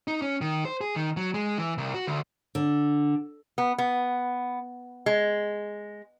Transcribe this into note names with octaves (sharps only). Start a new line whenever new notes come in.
D#4
C#4
D#3
C5
G#4
D#3
F#3
G#3
E3
C2
F#4
D2
D3
B3
B3
G#3